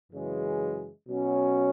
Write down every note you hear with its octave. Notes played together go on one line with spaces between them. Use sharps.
F#2 C#3 E3 G#3
B2 F#3 C#4